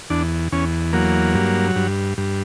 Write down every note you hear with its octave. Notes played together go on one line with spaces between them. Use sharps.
E2 D4
E2 C#4
F#3 A#3
G2
G2
G2